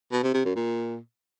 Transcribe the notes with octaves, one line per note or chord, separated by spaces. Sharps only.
B2
C3
C3
F#2
A#2